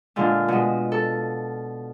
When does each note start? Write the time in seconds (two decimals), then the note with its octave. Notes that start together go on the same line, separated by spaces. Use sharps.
0.16 A#2 D3 G#3 F4
0.48 B2 G#3
0.92 A4